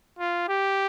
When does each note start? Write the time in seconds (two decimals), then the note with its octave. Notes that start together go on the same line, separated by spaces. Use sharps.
0.19 F4
0.48 G4